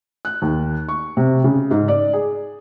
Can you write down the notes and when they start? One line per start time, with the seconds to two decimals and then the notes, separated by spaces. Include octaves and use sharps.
0.25 F#6
0.42 D#2
0.88 C#6
1.17 C3
1.44 C#3
1.71 G#2
1.88 D5
2.13 G#4